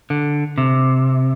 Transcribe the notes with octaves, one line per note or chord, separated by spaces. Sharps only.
D3
C3